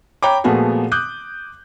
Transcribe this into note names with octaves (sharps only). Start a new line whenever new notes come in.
C#5 G5 A#5 B5 D6
A#2 F3 A3 B3 F#4 G#4
D6 D#6 F#6 G6